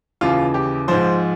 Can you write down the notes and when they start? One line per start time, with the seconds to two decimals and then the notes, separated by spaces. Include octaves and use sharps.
0.21 D#2 C#3 E3 F4
0.54 G4
0.88 G#2 F3 C5